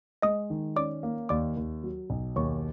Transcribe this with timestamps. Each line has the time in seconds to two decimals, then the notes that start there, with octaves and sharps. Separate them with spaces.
0.22 G#3 D#5 D#6
0.50 D#3
0.76 C#4 D5 D6
1.03 A#3
1.29 D#2 D5 D6
1.57 D#2
1.83 F#3
2.10 B1
2.36 D#2 C#5 C#6